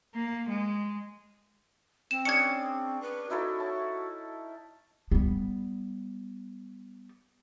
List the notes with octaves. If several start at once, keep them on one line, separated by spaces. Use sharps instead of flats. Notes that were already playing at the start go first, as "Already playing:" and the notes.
A#3
G#3
C4 E7
C#4 D4 G#4 G#6 C#7
B4
D#4 E4 F#4 A4
C#5 A5
G3 B3